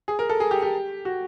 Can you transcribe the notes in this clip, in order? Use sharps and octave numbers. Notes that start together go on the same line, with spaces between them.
G#4
A#4
A4
G#4
G4
G4
F#4